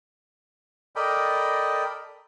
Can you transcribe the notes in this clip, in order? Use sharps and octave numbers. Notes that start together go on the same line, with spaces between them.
A4 A#4 D5 D#5 G5 B5